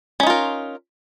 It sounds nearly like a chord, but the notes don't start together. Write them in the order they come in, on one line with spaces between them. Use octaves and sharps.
C#4 D#4 F4 A#4